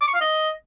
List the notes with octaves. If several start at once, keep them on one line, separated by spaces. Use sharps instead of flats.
D6
C#6
F5
D#5